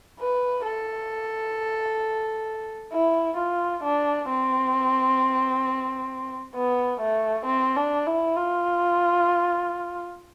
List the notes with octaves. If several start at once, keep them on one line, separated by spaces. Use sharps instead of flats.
B4
A4
E4
F4
D4
C4
B3
A3
C4
D4
E4
F4